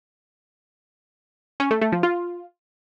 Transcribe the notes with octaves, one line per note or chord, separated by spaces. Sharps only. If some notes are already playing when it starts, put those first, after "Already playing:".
C#4
A3
A3
F3
F4